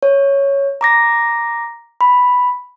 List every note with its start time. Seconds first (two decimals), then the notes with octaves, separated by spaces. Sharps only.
0.03 C#5
0.81 A#5 D6 A#6
2.01 B5